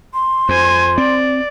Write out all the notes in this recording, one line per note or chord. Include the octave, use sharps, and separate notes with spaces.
C6
F2 C5 G#5
C4 D5